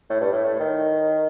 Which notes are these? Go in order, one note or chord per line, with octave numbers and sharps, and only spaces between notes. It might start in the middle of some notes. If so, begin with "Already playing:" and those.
A2
G2
A2
A2
D#3